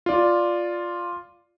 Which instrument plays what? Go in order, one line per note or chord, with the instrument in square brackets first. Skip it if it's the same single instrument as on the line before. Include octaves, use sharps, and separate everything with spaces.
[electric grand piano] F4 D5